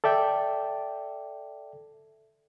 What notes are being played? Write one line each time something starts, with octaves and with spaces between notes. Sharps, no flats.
A4 D5 E5 G5